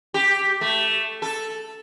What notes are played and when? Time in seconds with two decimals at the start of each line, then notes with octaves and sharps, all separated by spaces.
0.14 G4
0.61 A3
1.22 A4